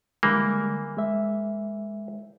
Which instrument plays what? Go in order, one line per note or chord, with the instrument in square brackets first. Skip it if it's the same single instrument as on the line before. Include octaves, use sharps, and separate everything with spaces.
[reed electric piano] D3 G3 G#3 [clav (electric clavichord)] E3 A#3
[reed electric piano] G#3 E5